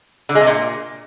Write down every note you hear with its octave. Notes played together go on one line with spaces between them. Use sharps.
D3
G#3
C3
A#2